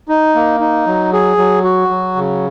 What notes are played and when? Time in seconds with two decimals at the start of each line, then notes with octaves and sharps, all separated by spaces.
0.08 D#4
0.35 A#3
0.60 D#4
0.87 F#3
1.13 G#4
1.38 F#3
1.64 F#4
1.90 F#3
2.16 C#3